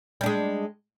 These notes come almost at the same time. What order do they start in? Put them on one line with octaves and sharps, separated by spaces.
G3 D4 G#3